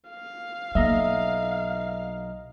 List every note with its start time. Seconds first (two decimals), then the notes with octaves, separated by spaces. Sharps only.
0.10 F5
0.75 B1 A#3 D#5 E5 A#5